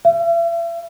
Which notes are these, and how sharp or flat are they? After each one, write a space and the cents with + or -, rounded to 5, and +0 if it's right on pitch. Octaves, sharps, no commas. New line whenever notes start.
E5 +40